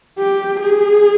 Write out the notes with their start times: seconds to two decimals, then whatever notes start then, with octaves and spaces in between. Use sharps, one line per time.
0.19 G4
0.60 G#4